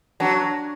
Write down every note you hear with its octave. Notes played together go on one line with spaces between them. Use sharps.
F#3 D4